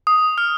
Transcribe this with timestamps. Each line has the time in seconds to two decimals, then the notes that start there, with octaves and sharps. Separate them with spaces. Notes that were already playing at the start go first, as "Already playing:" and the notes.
0.07 D#6
0.38 F6